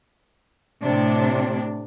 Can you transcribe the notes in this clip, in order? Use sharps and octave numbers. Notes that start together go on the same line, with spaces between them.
A2 C3 D4